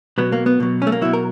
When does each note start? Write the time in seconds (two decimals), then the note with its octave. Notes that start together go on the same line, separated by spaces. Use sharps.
0.18 B2 F#3 B3
0.32 A#3
0.46 B3
0.60 B2 F#3
0.82 C#4
0.87 A3
0.92 A#3
1.01 B2 F#3 E4
1.13 A#4